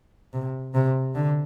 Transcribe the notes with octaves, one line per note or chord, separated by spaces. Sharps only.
C3
C3
D3